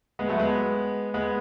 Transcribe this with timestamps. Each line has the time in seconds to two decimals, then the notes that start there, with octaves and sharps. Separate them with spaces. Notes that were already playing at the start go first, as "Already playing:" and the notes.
0.19 G#3 B3
0.29 F#3 A3
0.39 G#3 B3
1.14 G#3 B3